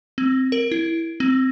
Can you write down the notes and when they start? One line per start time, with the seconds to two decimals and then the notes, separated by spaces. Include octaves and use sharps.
0.18 C4
0.52 A#4
0.71 E4
1.20 C4